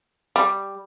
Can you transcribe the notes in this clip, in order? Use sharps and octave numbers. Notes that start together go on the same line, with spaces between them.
G3